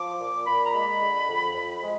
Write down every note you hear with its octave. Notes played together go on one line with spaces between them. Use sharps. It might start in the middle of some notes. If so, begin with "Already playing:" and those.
Already playing: F3 D6
A#2
A#2 B5
A#5
G#3 B5
D3
F2
F2
G#3